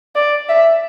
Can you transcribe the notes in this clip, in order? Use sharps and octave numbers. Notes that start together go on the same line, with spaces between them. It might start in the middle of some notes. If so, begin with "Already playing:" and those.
D5
E5